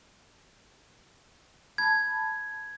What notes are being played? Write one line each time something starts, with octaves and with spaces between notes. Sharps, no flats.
A5 B5 G#6